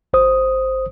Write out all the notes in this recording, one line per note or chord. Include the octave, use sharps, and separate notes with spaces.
G1 C5 D#6